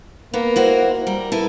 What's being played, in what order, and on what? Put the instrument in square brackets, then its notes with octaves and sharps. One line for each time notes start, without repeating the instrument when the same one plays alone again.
[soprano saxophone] A#3 [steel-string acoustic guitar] B3
[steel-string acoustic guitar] E4 F#4 C5
[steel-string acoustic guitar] G3 [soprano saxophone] A#4
[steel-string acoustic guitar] E4 A4 B4